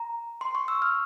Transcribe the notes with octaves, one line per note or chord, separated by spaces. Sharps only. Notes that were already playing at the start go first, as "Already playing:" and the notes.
Already playing: A#5
C6
C#6
E6
F6